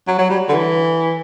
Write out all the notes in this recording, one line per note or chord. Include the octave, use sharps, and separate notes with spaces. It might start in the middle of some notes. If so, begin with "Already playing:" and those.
F#3
F#3
G3
D3
E3